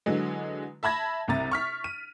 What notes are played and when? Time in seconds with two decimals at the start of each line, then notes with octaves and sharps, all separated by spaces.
0.06 D3 E3 F#3 G#3
0.83 E5 A5 B5 G#6 A#6
1.28 C2 C3 A#5 A6
1.51 C#6 F6 B6
1.84 D#7